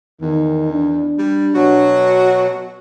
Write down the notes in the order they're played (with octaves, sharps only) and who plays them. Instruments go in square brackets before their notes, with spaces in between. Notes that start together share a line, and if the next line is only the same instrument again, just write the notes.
[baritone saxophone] E2 [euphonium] D#3
[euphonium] D4
[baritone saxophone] G3
[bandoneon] B2 F#3 [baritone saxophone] F#4